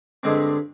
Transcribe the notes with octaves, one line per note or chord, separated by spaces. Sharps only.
G2 D3 G#3 C4